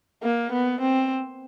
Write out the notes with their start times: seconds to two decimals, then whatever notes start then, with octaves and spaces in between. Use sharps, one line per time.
0.23 A#3
0.52 B3
0.81 C4